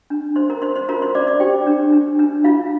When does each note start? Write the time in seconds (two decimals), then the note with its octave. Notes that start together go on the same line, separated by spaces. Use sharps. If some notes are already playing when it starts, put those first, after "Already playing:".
0.10 D4
0.36 C5 C6
0.49 A#4 A#5
0.62 C5 C6
0.75 C5 C6
0.89 F4 A#4 A#5
1.02 C5 C6
1.15 C5 D5 D6
1.27 D5 D6
1.40 G4 C5 G5
1.67 D4
1.92 D4
2.19 D4
2.44 E4 F4 F5